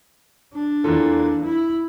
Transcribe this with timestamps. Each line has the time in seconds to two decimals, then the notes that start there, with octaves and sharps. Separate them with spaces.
0.54 D4
0.84 E2 E3 A#3 F4 A4
1.44 E4